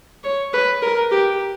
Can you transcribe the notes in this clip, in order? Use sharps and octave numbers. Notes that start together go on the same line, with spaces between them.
C#5
B4
A#4
G4